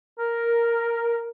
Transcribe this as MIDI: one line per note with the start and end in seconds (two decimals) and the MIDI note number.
0.19 1.30 70